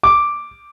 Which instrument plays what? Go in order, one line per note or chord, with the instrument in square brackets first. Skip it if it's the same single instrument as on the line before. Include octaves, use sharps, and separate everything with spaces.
[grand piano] D6